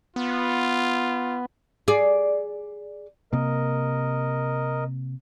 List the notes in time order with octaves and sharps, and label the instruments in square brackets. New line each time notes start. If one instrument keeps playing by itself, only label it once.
[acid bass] B3 [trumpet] F4
[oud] G#4 D5
[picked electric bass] C3 A#3 [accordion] A#4 D#5